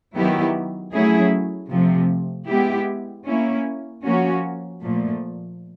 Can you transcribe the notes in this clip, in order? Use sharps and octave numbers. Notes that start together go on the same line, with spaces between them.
D#3 F#3 B3 E4 G4
F#3 A3 C#4 E4 G#4
C3 F3 A3
G#3 B3 E4 G4
A#3 C#4 E4
F3 A#3 C#4 F#4
A#2 F3 A3